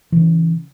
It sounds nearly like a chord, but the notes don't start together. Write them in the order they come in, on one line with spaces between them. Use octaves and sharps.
E3 C#3 C#4